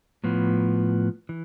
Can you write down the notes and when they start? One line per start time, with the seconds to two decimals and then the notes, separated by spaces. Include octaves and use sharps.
0.24 A2 F3 B3
1.29 E3